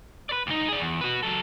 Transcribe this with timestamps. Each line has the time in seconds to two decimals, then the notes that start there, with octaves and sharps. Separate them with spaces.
0.29 B4 D5
0.47 D2 D#4
0.68 G#4 D5
0.80 E2
1.01 F#4 B4
1.23 F#3 A4